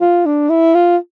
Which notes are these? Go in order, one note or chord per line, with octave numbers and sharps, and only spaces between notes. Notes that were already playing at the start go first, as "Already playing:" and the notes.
F4
D4
E4
F4